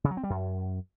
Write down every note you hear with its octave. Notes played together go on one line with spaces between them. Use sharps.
C#3
F#3
C4
G3
F#2